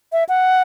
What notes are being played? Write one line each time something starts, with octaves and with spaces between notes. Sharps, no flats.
E5
F#5